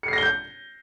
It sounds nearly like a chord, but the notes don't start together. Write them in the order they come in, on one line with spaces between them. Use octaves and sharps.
C#7 C7 A#6 G7 G6